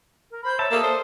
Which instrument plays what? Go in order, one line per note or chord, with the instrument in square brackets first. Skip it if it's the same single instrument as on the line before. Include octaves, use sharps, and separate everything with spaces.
[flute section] A#4
C5 B5 G6
[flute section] C#5 A#5 [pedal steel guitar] E5 A5
[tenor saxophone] A#3 [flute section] A4 D5 D#6
[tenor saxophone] C5